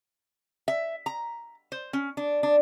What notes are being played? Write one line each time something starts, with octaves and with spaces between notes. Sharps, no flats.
E5
A#5
C5
C#4
D4
D4